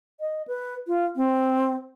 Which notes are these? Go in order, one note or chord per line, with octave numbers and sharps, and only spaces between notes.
D#5
B4
F4
C4